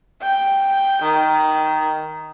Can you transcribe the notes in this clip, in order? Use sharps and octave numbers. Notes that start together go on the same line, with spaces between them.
G5
D#3